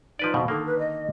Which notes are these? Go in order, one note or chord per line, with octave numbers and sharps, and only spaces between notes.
F3 D#4 B4 D5
F2 B2
D3 D#3 A#3 A4
B4
D#5